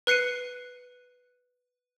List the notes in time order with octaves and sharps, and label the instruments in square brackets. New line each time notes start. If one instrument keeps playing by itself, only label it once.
[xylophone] B4 F#6 C7 C#7 D#7